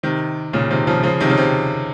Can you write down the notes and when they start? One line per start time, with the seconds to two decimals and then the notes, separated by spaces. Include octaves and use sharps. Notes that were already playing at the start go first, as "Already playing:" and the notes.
0.03 C3 D#3
0.53 A#2 C#3
0.70 C3 D#3
0.87 C#3 F3
1.03 C#3 F3
1.20 C3 D#3
1.30 C#3
1.37 C3